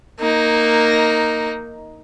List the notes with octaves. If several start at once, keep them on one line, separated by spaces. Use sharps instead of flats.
A#3 D#4